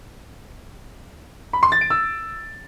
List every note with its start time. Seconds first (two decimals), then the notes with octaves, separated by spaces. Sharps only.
1.53 B5
1.63 C6
1.72 A6
1.81 D7
1.90 E6